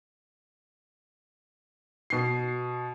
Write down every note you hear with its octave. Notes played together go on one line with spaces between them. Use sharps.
B2 C7